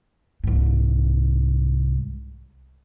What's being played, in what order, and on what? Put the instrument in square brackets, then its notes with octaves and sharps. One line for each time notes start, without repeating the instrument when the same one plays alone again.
[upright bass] C2 G#2